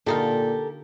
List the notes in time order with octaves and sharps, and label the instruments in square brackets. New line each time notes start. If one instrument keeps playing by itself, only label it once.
[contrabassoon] A#2 [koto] D3 D#4 F4 [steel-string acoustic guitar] G4 A4 A#4